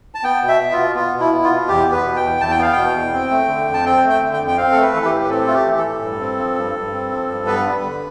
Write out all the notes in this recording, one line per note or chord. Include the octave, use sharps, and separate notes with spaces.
A5
B3 G5
B2
E5
B3
F4
B2
B3 F4
B2
E4
B3
F4
B2
E2 G4
B3
B4
B2
G5
E2
E2 A5
G5
B3 F5
B2 G5
E2
C4
A3
D3
F2
A5
C4 G5
A3
G5
D3
G5
F2
G5
C4 F5
A3 A4
B4
E3 A4
G4
A2
B4
C4 A4
A3 F4
G4
E3
A4
A2
G2
C4
F3
G2
G2
C4
F3
G2
B3 B4
G3
D3